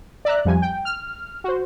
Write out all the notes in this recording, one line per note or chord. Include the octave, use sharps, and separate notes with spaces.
D5 E5 A#5 F#6
F2 F3 G3 G#5
G5
F6
F#4 C5